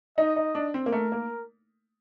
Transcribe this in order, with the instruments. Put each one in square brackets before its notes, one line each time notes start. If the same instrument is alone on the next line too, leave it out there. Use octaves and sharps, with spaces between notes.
[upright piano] D#4 [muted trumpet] D#5
[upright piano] D#4
D4
C4
A#3
[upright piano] A3 [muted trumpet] A#4
[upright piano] A#3